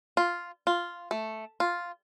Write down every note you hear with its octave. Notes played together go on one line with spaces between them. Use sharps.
F4
F4
A3
F4